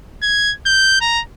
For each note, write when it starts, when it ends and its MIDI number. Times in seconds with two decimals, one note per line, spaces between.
0.23 0.54 92
0.66 0.97 91
1.01 1.21 82